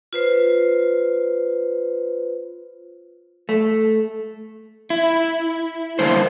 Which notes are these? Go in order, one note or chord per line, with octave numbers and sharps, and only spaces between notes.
F4 B4 C5
A3
E4
D3 G3 A#3 E4 C5